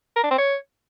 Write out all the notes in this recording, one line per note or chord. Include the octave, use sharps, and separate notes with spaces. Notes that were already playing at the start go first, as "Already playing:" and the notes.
A#4
D4
C4
C#5